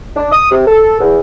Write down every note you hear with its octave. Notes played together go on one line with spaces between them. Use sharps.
D4
D#6
C3
A4
E2